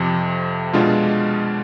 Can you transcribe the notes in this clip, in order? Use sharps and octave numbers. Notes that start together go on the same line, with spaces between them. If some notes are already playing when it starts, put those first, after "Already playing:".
Already playing: F2 C3 F3
B2 G#3 D4 F4